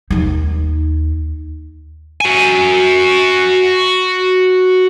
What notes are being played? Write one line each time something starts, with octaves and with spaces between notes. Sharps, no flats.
D#2 D#4
F#4 G#5